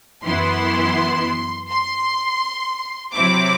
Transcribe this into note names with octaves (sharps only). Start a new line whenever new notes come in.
F#2 E3 B3 E4 C6
C6
C3 F#3 C4 E4 D6